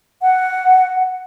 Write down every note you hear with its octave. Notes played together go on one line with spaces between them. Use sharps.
F#5